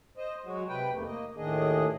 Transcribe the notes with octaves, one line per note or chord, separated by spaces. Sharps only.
C5 D#5
F#3 G#3 F#4
C3 B4 G5
E2 G#2 C3 A3 A#3
A#3 D#5
D#2 A2 D#3 D4 G#4 D#5